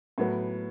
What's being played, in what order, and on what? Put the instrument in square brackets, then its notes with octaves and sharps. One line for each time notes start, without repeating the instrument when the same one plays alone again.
[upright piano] A2 F#3 B3